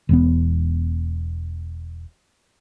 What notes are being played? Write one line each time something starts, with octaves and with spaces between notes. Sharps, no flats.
E1 E2 B3